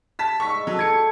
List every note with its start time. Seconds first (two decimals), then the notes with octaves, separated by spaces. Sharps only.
0.19 A5 B6
0.40 G#2 G3 E5 C#6 B6
0.67 F#3 A4
0.79 A3 G#6 C#7